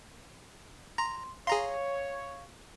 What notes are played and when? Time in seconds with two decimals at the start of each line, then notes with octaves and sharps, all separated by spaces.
0.98 A#5 C6
1.47 G#4 C#5 F5 A#5 C6